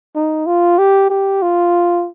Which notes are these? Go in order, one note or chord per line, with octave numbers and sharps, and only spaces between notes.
D#4
F4
G4
G4
F4